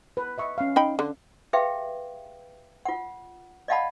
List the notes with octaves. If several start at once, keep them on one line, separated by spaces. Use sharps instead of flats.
B4
D#5 E5 C#6
C#4 F5
D#4 G5 B5
D3
G4 G#4 B4 E5 F5 G5
F4 F#5
D5 D#5 F5 F#5 A5 B5